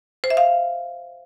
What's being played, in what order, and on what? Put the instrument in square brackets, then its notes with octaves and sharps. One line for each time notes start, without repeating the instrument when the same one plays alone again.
[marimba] C5
E5
F5